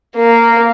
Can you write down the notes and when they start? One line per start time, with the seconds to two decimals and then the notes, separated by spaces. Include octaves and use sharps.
0.16 A#3